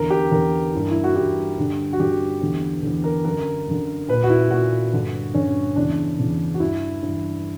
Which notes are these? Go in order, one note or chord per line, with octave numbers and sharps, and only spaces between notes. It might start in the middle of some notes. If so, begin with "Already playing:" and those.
Already playing: E2 D3 A#4
G4
E2 D3 A#4
G2 E3
E4
F#4
G2 E3 G4
G2 D3
F#4
G2 D3 G4
E2 D3
E2 D3
A#4
F#2 D3 A#4
F#2 D3
A#2 B4
F#4
E4
A#2 F#4
G2 D3
G2 D3 C#4
E2 C#3 E3 D4
E2 C#3 E3
F#4
G2 E3 E4
G2 E3